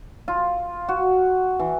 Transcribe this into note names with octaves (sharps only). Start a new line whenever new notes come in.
F4
F#4
E3